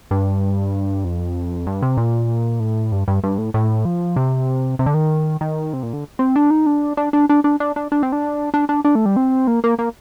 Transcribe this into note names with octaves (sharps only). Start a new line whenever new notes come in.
G2
F2
G2
C3
A#2
A2
G2
G2
G2
A2
A2
F3
C3
C3
D3
D#3
D#3
C3
A#2
D3
C4
D4
D#4
D4
D4
D4
D4
D4
D4
D4
D4
C4
D4
D4
D4
D4
A3
G3
C4
A#3
A#3
A#3